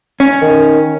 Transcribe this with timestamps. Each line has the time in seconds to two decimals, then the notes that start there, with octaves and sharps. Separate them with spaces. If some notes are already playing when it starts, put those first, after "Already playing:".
0.20 C#4
0.42 D#3